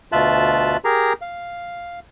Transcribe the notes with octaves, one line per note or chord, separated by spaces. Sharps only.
D2 B2 F4 E5 A5 F#6
G4 G#4 A#4 A#5
F5